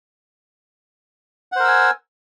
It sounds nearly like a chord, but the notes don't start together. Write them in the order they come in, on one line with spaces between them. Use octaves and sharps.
F#5 C5 A#4 E6 G#5